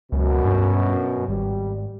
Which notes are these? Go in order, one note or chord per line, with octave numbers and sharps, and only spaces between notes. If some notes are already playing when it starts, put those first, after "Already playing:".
C#2 F#2 B2
G2
G#1 G3